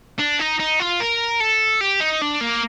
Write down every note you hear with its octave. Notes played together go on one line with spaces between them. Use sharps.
D4
D#4
D#4
F4
A#4
A4
G4
D#4
D4
A#3